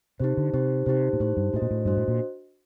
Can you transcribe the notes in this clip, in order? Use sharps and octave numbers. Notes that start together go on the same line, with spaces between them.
C3 D#4 G4 C5
D3
C3 D#4 G4 C5
C3 D#4 G4 C5
A#2
A2 D#4 G4 C5
G2
A2 D4 F#4 C5 D#5
A#2
A2
G2 D4 F#4 C5 D#5
A2
A#2